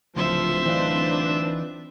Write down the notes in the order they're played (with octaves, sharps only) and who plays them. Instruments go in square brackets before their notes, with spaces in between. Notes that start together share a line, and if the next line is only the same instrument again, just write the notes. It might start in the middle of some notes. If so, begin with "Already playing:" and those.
[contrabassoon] D1 [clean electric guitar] C#2 [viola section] F3 [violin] C5 E5
[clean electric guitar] E3 D#4 F4 [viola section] C4 D4 B4